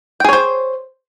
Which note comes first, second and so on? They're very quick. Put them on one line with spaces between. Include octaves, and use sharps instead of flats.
G5 G#4 C#5 C5